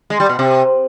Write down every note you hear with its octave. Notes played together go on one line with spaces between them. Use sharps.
G#3
G3
B2
C3